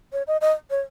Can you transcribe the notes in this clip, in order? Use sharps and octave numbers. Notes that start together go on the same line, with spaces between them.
C#5
D#5
D#5
C#5